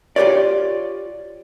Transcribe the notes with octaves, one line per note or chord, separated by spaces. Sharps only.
F4 G4 B4 C#5 D5